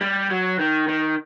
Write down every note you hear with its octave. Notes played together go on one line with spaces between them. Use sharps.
G3
F#3
D#3
D#3